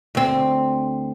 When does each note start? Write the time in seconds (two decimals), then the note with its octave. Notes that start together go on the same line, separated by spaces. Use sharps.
0.15 D2 C4